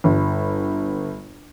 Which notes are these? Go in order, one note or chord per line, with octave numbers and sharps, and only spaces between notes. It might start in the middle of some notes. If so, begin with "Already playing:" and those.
G1